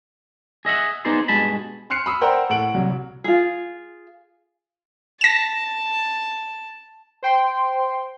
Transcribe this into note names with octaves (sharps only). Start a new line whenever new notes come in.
G#4 D#5 E5 F#5
B3 D#4 G#4 C5 D5 C6
G2 B2 G#3 G#4 A5 B5
C6 F6 F#6 C7 C#7
B5 D#6 E6
A#4 C5 D5 F#5 G5 A#5
A2 A4 F#5 D7 F#7
C2 C3 F#3
F4 G#4
A5 A#6 E7
C5 G5 C6